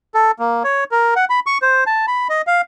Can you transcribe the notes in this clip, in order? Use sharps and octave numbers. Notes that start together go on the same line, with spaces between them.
A4
A#3
C#5
A#4
F#5
B5
C#6
C5
A5
B5
D#5
F5